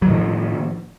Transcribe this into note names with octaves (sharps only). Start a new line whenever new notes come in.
A2 D#3 F3 F#3